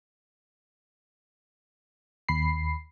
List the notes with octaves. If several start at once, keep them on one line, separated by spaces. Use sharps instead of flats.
D#2 B5 C7